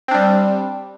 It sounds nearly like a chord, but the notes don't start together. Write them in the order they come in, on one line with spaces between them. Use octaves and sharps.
C4 D4 G3